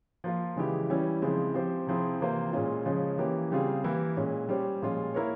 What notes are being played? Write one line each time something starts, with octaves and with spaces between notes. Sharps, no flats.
F3 A#3 F4
C#3 E3 G#3 E4 G4
E3 G3 C#4 E4
C#3 F3 G#3 C4 E4
F3 C4 G4 C5
C3 F3 C4 E4 G#4
C3 E3 A#3 F4 C5
A#2 G#3 C#4 F4
C#3 F3 G#3 C#4
E3 A#3 C#4 G4
C#3 G3 C4 F4 G#4
E3 A#3 E4 G4 A#4
A#2 G#3 C#4
G3 C#4 G4 C5
A#2 F3 G#3 C#4 F4
A#3 E4 A#4 C#5